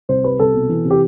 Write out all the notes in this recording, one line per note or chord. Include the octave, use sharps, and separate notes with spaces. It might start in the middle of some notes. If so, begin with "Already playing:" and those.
C2 C5
G3 B4
C2 A4
B2
E3
C3
G4